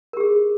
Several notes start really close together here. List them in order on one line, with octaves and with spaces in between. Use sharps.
A#4 G4 G#4